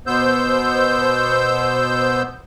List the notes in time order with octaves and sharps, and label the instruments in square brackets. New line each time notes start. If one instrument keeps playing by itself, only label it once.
[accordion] B2 B3 C5 E6 G6